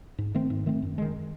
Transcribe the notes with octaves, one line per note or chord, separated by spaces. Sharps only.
G#2
D#3 A3 C4
G#2
D#3 A3 C4
F#2
D#3 G#3